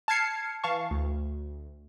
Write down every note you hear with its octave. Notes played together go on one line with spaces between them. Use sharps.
A5 F6 G#6 C7 C#7
E3 F5 A5 C#6
D2